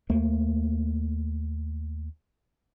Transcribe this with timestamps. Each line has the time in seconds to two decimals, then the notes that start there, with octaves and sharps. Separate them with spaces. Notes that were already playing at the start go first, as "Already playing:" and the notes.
0.10 D#2 A3 A#3